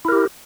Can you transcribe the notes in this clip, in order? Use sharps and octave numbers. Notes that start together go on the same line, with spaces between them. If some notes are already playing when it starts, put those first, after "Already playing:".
E4 G4 A#4